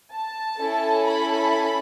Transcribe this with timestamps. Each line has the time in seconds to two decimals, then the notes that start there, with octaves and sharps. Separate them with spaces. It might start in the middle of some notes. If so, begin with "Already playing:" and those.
0.12 A5
0.59 C#4 E4 A4
1.05 B5